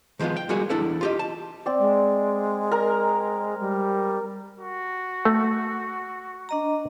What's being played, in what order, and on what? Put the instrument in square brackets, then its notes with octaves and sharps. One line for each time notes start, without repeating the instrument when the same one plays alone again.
[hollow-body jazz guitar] D#3 F3 G#3 B3 F4
G5
G3 G#3 A#3 F#4 G#4
E2 D4 E4 A4 F#5
F4 G4 D#5
A5
[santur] C4 D5
[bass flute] G#3
[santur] A#4 A#5
[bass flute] G3
[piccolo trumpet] F#4
[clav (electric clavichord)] A3
[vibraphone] D4 D#5 A#5